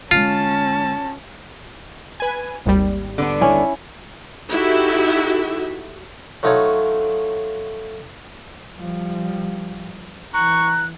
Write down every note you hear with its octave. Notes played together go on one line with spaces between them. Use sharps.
D3 G#3 C#4 F4 A5
B4 G#5
G#1 D#2 G3
D3 B3 D4
C#4 E4
D#4 E4 F#4 G4 A4 E5
F#3 A3 D#4 F4 A4 C#5
F3 G3
E3 A#5 C#6 F#6